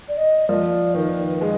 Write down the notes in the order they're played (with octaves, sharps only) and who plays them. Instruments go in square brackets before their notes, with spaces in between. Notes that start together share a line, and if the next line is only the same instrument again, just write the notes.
[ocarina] D5
D#5
[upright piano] F3 [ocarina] D5
[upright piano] D#3 [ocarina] B4
[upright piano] G#3 [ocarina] B4